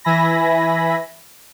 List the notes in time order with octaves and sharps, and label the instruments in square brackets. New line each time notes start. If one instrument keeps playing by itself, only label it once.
[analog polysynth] E3 E5 G#5 B5 A#6